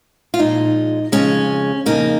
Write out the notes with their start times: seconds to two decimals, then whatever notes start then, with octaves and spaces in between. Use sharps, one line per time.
0.34 F4
0.39 A#2 F3 G#3 D#4
1.12 F2 C#3 G#3 C#4
1.86 F2 C#3 A#3 D#4